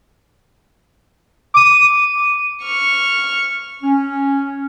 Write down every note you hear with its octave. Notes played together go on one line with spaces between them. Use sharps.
D6 D#7
C#6 F6
C#4